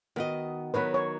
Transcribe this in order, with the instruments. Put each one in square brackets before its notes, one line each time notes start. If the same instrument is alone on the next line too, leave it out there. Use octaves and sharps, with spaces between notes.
[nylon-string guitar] D#3 B3 F#4 D#5
[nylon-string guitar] D#3 F#3 B3 [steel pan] B4
[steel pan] C#5